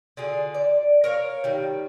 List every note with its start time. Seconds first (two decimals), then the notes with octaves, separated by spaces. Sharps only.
0.17 D3 F4 G#4
0.54 D5
1.04 A#4 C#5 F5
1.44 D#3 G3